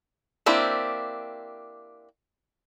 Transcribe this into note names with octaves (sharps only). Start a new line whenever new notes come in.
A#3 C4 D4 E4 G4